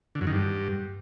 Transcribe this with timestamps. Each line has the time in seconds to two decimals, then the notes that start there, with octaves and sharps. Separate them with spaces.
0.15 D3
0.21 F#2
0.27 D#3
0.33 G2